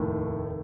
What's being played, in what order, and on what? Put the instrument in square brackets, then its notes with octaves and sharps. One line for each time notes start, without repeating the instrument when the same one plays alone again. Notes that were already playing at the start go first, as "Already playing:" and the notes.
Already playing: [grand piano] F1 D#2 D#3 A3 [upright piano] A2